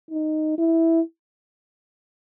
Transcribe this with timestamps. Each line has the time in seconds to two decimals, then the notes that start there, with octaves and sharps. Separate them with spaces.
0.11 D#4
0.58 E4